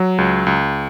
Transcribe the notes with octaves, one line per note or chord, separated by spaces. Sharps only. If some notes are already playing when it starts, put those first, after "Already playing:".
Already playing: F#3
C#2
C#2